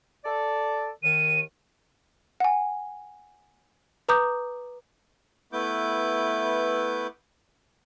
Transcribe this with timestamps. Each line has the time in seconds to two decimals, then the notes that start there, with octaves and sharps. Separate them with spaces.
0.25 A4 D5
1.03 D#2 D#3 D#7
2.40 F#5 G#5
4.09 B4 A#5 D6 D#6 G6
5.53 A3 B3 E4 B4 D6 G6